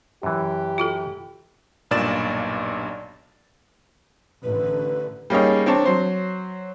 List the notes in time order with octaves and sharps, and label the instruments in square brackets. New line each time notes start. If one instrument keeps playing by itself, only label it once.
[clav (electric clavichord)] F#2 E3 [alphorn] G4
[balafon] F4 F#4 A4
[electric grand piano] B1 G2 A#2 D5 A6 E7
[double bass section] A1 D3 [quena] B4
[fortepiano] G3 A#3 C#4 D#4 G#4 C#5
C4 D4 C#5 A5
F#3 C5